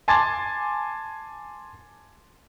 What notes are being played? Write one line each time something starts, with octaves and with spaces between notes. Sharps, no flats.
G#5 A5 C6 D6 G#6 A6